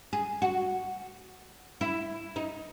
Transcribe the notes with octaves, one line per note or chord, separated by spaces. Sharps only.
G#4
F#4
E4
D#4